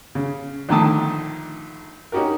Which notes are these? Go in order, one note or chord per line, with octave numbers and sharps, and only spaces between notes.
C#3
A#1 D3 D#3 A3 A5 D#6
C#4 D#4 F#4 G4 A#4